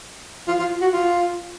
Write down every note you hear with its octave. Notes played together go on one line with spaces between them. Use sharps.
F4
F4
F#4
F4